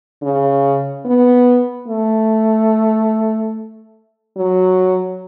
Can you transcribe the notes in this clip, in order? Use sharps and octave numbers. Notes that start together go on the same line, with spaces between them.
C#3
B3
A3
F#3